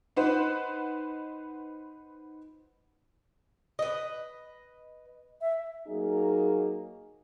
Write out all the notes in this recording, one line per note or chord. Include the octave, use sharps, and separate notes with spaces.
D#4 B4 C5 F#5
B4 D#5
E5
F#3 A#3 D#4 G#4